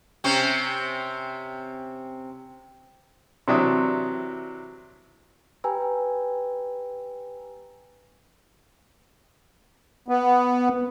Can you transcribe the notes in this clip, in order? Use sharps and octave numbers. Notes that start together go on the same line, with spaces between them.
C3 C4 C#4
C3 E3 F#3 D4 E5 D#6
G4 B4 G5 G#5 A#5 E6
B3